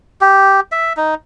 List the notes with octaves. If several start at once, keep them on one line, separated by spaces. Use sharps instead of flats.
G4
E5
D#4